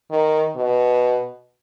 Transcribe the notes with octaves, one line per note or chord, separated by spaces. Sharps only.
D#3
B2